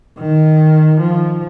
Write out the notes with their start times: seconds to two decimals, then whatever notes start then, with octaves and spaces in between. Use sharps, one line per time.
0.19 D#3
1.01 F3